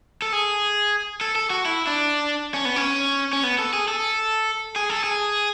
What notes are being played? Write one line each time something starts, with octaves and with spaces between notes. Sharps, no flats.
A4
G#4
A4
A4
F#4
E4
D4
C#4
B3
C#4
C#4
B3
A4
G#4
A4
G#4
A4
G#4